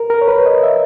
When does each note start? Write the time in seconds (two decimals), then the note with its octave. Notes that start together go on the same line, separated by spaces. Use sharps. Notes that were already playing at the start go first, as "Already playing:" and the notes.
Already playing: A#4
0.10 A#4
0.21 C#5
0.28 B4
0.46 D#5
0.63 E5